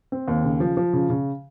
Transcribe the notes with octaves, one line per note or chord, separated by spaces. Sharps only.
C4
D#2
C#3
F3
F3
C#3
C#3